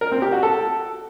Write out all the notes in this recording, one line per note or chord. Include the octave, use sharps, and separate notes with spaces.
A#4
C4
G4
F#4
A4